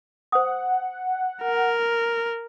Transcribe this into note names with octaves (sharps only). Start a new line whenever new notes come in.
C5 F#5 D#6
A#4